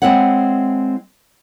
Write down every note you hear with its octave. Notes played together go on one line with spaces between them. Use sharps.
G#3 C4 E4 C#5 F#5